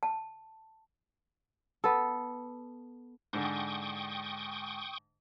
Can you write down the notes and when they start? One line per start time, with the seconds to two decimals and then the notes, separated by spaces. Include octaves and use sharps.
0.03 A5
1.84 B3 A4
3.33 G#2 D3 G5 C#6 D#6